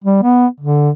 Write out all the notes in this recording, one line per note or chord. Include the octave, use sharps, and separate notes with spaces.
G3
B3
D3